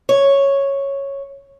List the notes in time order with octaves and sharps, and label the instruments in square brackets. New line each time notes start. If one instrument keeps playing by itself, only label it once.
[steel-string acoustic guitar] C#5